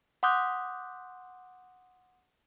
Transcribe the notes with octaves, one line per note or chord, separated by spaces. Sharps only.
F#5 C6 D6 D#6 F#6 G6